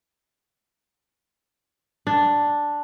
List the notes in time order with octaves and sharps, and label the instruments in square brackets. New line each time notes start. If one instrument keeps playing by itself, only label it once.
[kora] D4